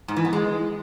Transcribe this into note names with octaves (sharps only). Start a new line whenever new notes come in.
G#2
E3
B3
G#3